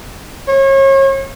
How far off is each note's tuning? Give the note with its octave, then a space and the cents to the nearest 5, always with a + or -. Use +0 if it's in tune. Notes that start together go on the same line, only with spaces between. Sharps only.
C#5 -35